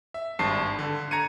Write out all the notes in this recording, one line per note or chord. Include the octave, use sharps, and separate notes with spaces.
E5
G#1 G2 A5 C7
D3
A#5 G#6 A6 C#7 D#7